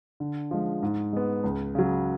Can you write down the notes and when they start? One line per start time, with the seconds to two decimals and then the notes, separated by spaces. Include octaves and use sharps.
0.20 D3
0.51 F3 G#3
0.83 G#2
1.13 G#3 B3
1.44 C#2
1.75 C#3 F#3